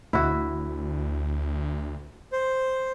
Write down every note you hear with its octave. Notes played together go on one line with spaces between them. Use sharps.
D2 E4 F#4
C5